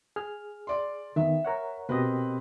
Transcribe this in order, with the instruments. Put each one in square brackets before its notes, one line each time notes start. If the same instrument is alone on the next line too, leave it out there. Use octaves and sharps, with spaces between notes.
[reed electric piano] G#4 F6
[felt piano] D5 C6
[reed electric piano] D#3 B3 [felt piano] E5
[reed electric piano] A#4 C#5 F#5
[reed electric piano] B2 G4 D#5 [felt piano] C4 A#4 B4